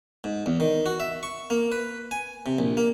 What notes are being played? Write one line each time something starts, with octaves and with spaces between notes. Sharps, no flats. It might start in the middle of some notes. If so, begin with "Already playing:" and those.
G#2
E2
D#3
F#4
E5
C#6
A#3
B4
G#5
C3
A#1
A#3